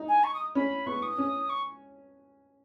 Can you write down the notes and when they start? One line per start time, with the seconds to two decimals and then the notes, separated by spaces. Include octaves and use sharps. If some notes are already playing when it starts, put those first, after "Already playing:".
Already playing: D#4
0.08 G#5
0.24 C#6
0.34 D#6
0.55 C#4 B5
0.86 B3 C#6
1.03 D#6
1.18 C#4
1.50 C#6